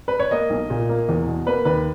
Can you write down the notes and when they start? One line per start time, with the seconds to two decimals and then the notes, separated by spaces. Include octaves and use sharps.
0.08 B4
0.20 C#5
0.31 A#3 D#5
0.50 B1
0.70 A#2
0.89 A#3
1.09 E2
1.27 B2
1.46 A#3 B4
1.65 D#2 B4